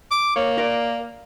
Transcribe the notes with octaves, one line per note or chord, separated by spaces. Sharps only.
D6
A#3 C#5
A#4 D5